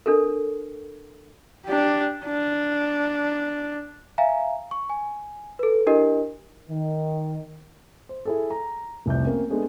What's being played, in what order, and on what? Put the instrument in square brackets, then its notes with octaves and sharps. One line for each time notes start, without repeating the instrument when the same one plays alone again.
[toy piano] D4 A4 A#4
[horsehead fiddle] D4 G4
D4
[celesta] E5 F5 G#5 A#5
C#6
G#5
A4 B4
D4 E4 G4 A#4 D#5
[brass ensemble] D#3
[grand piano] C5
E4 G#4 A4
A#5
F1 C2 F2 G6
A#3 C4 C#4
G#3 A3 B3 D4 G#4